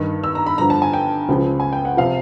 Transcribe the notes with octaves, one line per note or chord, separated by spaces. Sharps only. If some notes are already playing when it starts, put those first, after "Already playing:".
Already playing: G2 D#3
E6
A#5
B5
G2 D3 F3 A#5
A5
G#5
G5
C#2 C#3 F3
G#5
G5
F#5
C3 F3 F5